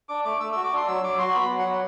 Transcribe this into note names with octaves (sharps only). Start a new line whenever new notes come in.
D4 D6
A3 D6
A3 E6
F#4 E6
D6
D4 C6
F#3 E6
F#3 D6
F#4 C6
B3 B5
F#3
F#5
F#3